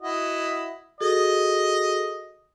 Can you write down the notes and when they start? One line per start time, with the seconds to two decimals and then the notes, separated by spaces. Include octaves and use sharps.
0.01 E4 F#4 D#5
1.00 F#4 G#4 A4 D#5